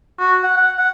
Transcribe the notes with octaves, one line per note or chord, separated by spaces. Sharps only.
F#4
F#5
F#5
F#5